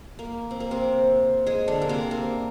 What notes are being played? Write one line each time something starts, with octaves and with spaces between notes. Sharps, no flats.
A#3
C4
A#3
C3 C4
G#3 G#4
D3 D4
A#3
C3 C4
A#3